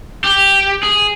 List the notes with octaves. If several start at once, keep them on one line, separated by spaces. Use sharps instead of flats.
G4
G#4